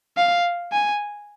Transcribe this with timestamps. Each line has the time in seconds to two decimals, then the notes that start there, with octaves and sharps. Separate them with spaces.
0.17 F5
0.73 G#5